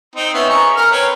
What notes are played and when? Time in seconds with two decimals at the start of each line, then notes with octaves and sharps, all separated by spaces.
0.15 C4 D#4
0.34 B3 C#4 E5
0.50 G#4 A#5 C#6
0.76 A#4 F6
0.91 C4 B4 C#5